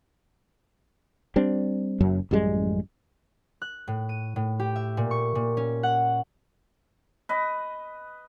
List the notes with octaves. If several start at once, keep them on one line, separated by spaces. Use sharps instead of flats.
G3 C4 D4
F#1 F#2 F#3
A1 F#2 G3 G#3
F#6
A2
D#7
A2
G4
E5
A#2
C#6
A#2
C#4
F#5
B4 D#5